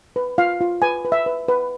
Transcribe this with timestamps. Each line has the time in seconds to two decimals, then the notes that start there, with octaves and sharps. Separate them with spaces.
0.16 B4
0.38 F4 F5
0.61 F4
0.82 B4 G#5
1.05 B4
1.12 E5
1.26 B4
1.48 B4